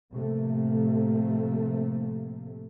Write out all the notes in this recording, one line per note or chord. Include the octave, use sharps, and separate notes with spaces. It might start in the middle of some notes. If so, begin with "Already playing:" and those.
A2 C3 F3 A3 A#3